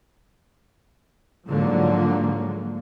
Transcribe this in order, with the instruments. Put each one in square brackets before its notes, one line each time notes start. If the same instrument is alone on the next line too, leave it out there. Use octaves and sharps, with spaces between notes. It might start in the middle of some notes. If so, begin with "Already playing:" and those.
[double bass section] G#2 D3 F3 F#3 A#3